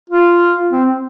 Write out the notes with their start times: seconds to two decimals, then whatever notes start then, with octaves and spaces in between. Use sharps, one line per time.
0.10 F4
0.72 C4